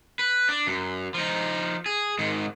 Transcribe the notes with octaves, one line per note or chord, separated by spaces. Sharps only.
B4
D4
F#2
F3 D#4
G#4
G#2 D#3